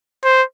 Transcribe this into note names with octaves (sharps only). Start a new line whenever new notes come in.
C5